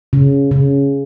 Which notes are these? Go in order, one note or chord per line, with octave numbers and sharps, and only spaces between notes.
C#3
C#3